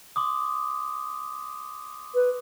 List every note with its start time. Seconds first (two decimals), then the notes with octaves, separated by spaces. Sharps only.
0.16 C6 D6 D#6
2.15 B4